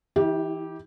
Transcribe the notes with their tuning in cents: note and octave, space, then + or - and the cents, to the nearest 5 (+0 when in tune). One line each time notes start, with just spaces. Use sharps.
E3 +0 E4 -45 G4 +0